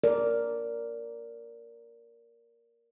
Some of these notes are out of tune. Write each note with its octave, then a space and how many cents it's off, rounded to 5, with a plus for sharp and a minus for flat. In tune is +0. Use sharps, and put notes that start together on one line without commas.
A#4 +0 D5 -15